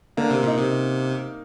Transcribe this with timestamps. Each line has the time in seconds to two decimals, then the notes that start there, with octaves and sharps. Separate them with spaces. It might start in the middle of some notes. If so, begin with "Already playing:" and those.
0.17 D3 A#3
0.30 C3
0.43 A#2 D#4
0.56 C3